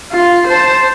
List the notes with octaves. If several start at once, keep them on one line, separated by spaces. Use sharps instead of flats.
F4
C5 A5